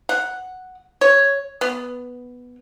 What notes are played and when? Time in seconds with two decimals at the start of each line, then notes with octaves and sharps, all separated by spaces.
0.09 F#5
1.01 C#5
1.61 B3